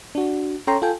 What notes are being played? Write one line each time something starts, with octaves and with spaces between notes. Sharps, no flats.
D4 F#4
C#4 A4 C#5 G5 A#5 C6
F4 A4 G5 G#5